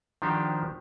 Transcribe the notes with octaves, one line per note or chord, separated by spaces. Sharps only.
D#3 F3 D4 F#4 G4 C5